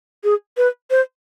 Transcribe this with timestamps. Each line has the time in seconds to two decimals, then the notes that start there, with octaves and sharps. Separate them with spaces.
0.24 G#4
0.57 B4
0.91 C5